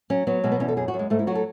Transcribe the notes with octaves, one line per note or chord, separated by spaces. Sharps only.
F#3 C#4
F#3 B3
B2 G#3
B3
E2 C#4
A4
F#2 G#4
F#4
F#2
G#3
G#2 A3
E4
F#3 F#4
A4